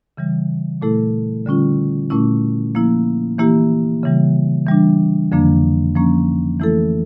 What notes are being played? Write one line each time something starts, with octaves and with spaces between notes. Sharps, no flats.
C#3 E3 G3
A#2 A3 E4 A4
D3 G3 C#4 F4
A#2 A3 C#4 E4
F3 A#3 E4
E3 A#3 E4 G4
C#3 E3 G3
E3 G3 D4
F2 D3 F3 A#3 D4
F3 A#3 C#4
E3 A3 E4 A4